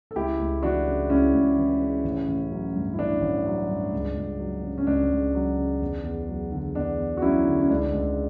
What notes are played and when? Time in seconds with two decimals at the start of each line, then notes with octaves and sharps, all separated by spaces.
0.11 A4
0.16 C#2 E4 G4
0.39 C#2
0.63 E3 D4 F#4
0.86 C#3
1.10 C#2 C#4 E4
1.34 C#2
1.57 E3
1.81 C#3
2.04 A1
2.28 A1
2.51 F#3
2.75 G2
2.94 E4
2.99 A1 D4
3.21 A1
3.46 F#3
3.69 G2
3.93 C#2
4.17 C#2
4.39 F#3
4.63 C#3
4.78 C#4
4.87 C#2 D4
5.10 C#2
5.34 F#3
5.58 C#3
5.81 E2
6.04 E2
6.28 F#3
6.52 D3
6.75 E2 D4
6.99 E2
7.17 F#4
7.22 F#3 C#4 E4
7.46 D3
7.60 C#4
7.70 C#2 D4
7.93 C#2